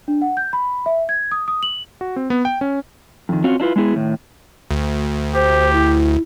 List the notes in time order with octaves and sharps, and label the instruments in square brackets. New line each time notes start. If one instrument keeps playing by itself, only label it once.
[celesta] D4
F#5
G6
B5
E5
G#6
D#6
D#6
F#7
[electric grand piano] F#4
C4
B3
G5
C#4
[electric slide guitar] F2 D#3
C4 C#4 F4 F#4
D4 E4 F4 B4
G#3 B3 E4 G#4
A2 D#3
[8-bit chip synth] D2
[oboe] G4 [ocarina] C5
[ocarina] E4